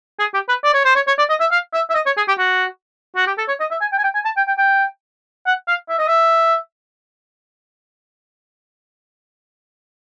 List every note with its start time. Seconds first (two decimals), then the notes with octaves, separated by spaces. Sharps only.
0.19 G#4
0.34 G4
0.49 B4
0.64 D5
0.74 C#5
0.85 C5
0.95 C#5
1.07 C#5
1.18 D5
1.29 D#5
1.41 E5
1.51 F5
1.74 E5
1.90 E5
1.95 D#5
2.06 C#5
2.17 G#4
2.28 G4
2.39 F#4
3.16 F#4
3.27 G4
3.38 A4
3.48 C#5
3.60 D#5
3.71 E5
3.81 G#5
3.92 G5
3.98 G#5
4.04 G5
4.14 G#5
4.25 A5
4.37 G5
4.47 G5
4.58 G5
5.46 F#5
5.68 F5
5.89 E5
5.99 D#5
6.08 E5